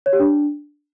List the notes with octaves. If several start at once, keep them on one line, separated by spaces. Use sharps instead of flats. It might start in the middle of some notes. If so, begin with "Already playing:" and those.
C#5
G4
D4